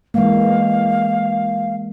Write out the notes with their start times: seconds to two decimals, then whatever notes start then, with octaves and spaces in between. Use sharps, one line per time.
0.14 E3 G#3 A#3 F5